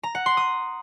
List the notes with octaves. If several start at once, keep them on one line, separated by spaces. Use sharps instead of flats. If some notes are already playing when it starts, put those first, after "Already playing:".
A#5
F#5
C6
D#6